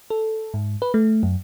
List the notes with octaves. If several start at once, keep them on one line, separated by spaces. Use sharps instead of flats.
A4
G#2
B4
A3
F#2